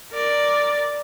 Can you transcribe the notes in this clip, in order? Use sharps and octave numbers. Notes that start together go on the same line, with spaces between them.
A#4 D5